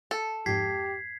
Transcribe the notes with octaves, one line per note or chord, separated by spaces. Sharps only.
A4
F2 G#2 G4 G#6 B6 C7